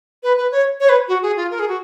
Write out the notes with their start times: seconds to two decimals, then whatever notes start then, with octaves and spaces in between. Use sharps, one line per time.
0.23 B4
0.38 B4
0.52 C#5
0.80 C#5
0.89 B4
1.08 F#4
1.22 G#4
1.37 F4
1.51 A#4
1.59 G#4
1.68 F#4